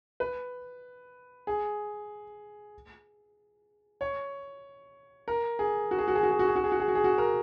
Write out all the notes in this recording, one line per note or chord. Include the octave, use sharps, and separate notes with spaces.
B4
G#4
C#5
A#4
G#4
F#4
G#4
F#4
G#4
F#4
G#4
F#4
G#4
F#4
G#4
F#4
G#4
F#4
G#4
F#4
A#4